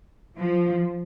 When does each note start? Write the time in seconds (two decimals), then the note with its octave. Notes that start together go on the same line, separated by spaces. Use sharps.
0.37 F3